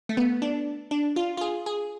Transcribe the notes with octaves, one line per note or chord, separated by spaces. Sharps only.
A3
B3
D4
D4
F4
F4
G#4
G#4